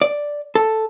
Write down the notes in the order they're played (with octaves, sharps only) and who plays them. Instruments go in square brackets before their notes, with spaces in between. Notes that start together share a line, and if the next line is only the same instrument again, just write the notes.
[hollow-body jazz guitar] D5
A4